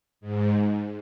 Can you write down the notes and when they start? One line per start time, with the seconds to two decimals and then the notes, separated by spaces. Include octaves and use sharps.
0.21 G#2